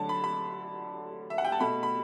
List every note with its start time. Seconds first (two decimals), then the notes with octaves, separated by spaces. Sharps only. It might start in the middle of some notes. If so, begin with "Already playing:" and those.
Already playing: D3 F#3 A3 A5
0.09 B5
0.24 B5
1.30 E5
1.38 F#5
1.45 G5
1.52 A5
1.60 B2 A3 B5
1.83 B5